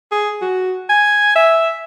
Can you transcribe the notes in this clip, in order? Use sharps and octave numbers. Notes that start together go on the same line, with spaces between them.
G#4
F#4
G#5
E5